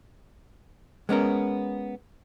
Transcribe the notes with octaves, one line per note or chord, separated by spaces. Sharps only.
G#3 B3 C#4 A#4